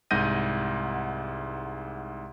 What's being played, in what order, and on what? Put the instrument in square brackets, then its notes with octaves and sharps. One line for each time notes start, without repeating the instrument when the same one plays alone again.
[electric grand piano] C2 G#2 F#5 G6 A#6 D#7